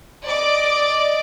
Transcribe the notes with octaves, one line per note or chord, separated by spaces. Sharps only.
D5 D#5 D6